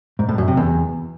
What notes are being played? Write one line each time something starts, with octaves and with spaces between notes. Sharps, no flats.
G#2
A2
F#2
C3
E2